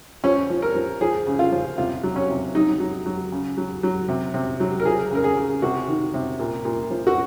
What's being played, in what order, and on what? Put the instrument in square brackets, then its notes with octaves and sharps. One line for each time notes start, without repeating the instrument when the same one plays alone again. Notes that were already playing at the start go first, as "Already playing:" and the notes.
[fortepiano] F3 C#4
F3
A#4
F3
F3 G#4
C#3
F4
F3
C3 F4
F#3
C#4
C3
F#3 D#4
F#3
F#3
C#3
F#3
F#3
C3
C3
F#3
A#4
F3 G#4
C#3 A#4
G#4
C#3
C3 F#4
D#3
C3
A#2
A#2
F3
F#4